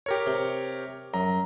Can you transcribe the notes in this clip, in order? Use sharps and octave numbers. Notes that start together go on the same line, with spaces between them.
G4 A#4 C#5
C3
F#2 A#5